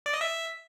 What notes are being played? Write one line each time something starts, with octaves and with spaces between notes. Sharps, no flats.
D5
D#5
E5